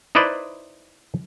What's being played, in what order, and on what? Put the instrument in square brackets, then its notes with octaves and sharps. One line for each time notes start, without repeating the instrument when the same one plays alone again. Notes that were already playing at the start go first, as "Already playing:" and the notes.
[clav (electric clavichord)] D#4 E4 B4 C5 D5